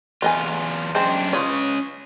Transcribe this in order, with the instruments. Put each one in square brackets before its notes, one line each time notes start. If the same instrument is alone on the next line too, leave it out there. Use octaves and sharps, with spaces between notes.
[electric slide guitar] E2 F4 [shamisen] B4 D#5 G#5
[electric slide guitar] F#2 D4 C5 [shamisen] G#3 C4
[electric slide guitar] C#4 D#5 [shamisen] F4 B4 C#5